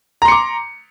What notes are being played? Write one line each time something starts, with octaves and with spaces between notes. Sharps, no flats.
A#5 C6 D6 C#7